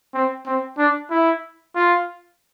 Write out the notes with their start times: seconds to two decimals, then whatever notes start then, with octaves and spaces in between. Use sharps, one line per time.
0.14 C4
0.46 C4
0.78 D4
1.10 E4
1.75 F4